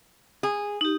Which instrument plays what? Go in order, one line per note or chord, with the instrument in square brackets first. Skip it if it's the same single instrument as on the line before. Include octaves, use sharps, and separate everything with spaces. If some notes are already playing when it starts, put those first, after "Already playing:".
[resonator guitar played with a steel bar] G#4
[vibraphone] D#4 G4